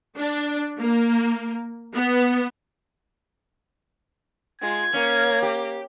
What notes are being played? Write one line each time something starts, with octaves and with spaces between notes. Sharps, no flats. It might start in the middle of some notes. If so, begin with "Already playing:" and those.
D4
A#3
B3
G#3 F4 G#6
A#3 C#4
G4